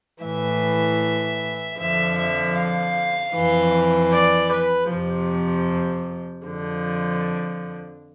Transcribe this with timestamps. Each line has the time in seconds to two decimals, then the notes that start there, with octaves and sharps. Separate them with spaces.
0.24 A2 E3 E5
1.79 F2 D3 F3 E5
2.19 E5
2.58 F5
3.35 F2 E3
4.13 D5
4.53 B4
4.91 F2 C3 F3
6.47 F2 D3 F3